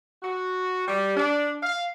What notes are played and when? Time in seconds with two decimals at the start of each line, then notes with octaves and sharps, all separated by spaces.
0.23 F#4
0.88 G3
1.17 D4
1.63 F5